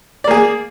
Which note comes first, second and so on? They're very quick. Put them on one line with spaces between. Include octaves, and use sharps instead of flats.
D5 A#3 G#4